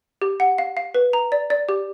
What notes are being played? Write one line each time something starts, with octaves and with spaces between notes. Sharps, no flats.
G4
F#5
F5
F5
B4
A#5
D5
D5
G4